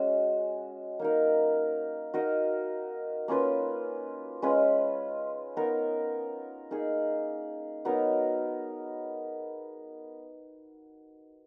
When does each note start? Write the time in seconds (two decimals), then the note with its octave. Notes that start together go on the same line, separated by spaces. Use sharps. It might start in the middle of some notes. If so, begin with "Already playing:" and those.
Already playing: G#3 C#4 F#4
0.99 A#3 D#4 A#4
2.14 D#4 F#4 A#4 D#5
3.28 A#3 C#4 F4 B4
4.42 G#3 C#4 F4 B4
5.57 B3 D#4 A#4
6.71 A#3 D#4 G#4
7.85 F#3 B3 D#4 A#4